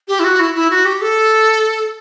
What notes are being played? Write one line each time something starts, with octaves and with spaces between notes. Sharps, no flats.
G4
E4
F#4
E4
E4
F#4
G4
A4